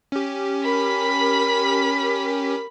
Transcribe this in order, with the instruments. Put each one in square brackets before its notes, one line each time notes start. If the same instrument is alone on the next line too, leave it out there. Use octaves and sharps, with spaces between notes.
[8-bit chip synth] C#4 G4
[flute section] A#4 [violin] B5 B6